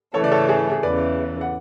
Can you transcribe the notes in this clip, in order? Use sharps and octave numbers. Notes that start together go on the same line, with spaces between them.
C#3 E3 A3 A4 C#5
D5
A4 C#5
G#4
G#4
E2 C#3 E3 B4 D5
F#5